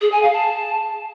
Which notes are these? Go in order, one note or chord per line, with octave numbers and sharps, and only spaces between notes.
G#4
G#5
F5
A5